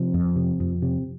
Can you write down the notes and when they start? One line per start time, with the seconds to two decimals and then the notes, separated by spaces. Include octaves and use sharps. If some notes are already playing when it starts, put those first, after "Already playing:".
Already playing: C3 F3
0.14 F2
0.36 C3
0.60 F2
0.82 C3